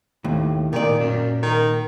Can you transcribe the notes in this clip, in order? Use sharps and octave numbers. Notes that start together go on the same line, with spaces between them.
D#2 A2
A#2 D#3 D5
F#2
D#3